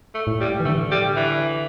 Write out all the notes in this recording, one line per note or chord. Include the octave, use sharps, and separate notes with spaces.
A3
A2
G3
E3
D3 A3
G3
E3